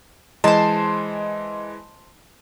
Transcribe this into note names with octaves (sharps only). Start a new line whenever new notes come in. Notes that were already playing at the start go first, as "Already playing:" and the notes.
E3 G#3 C5 D#5 A5 C6